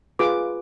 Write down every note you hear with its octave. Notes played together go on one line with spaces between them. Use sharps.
F4 G#4 B4 D6